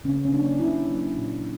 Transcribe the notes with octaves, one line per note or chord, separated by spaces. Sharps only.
C#3 C#4
C#4
F#3 A#3 D4
C#3 E4
F#3
A#3
A#2